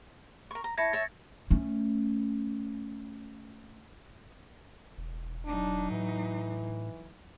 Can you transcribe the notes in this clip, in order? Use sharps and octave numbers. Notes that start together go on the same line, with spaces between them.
A#4 C#6
A#5
E4 C#5 A5 G#6 A#6 C#7
C#5 E5 A5 A6
A3 C#4
E1
F#3 D4 D#4
A2 E3